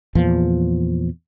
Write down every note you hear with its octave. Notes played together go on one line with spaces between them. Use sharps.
E2 A#2 F3